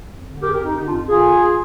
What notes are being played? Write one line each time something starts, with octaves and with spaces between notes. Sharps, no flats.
F2
D3
F2 G4 A#4
G#4
G4 A#4
F2
D#4 G4
D3 D#4 G4
D4 F4
F2
D3 F4 G#4
F2